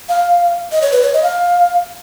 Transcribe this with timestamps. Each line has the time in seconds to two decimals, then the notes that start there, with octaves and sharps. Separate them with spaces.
0.09 F5
0.72 D#5
0.82 C#5
0.92 B4
1.02 C#5
1.14 D#5
1.23 F5